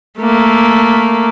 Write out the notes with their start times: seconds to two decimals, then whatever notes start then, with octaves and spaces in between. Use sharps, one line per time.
0.18 A3 A#3